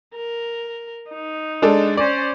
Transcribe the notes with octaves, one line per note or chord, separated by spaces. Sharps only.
A#4
D#4
G#3 D4 A4
C#4 C5 D5